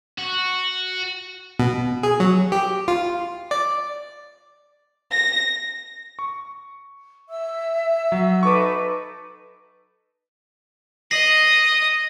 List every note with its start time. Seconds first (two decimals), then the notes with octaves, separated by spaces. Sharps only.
0.19 F#4
1.59 B2
2.03 G#4
2.20 F#3
2.52 G4
2.88 F4
3.51 D5
5.13 A#6
6.19 C#6
7.29 E5 E6
8.12 F#3
8.43 D#4 A4 B4 C#6 D6
11.11 D#5 D#6 A#6 C7 F#7